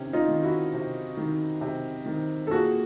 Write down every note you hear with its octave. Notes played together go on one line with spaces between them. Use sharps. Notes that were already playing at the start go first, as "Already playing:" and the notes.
Already playing: C3 D#3 C#4
D#4 F4
D#3
E4 F#4
C3
D#3
C3
D#3
A4
A#2 F#4 G#4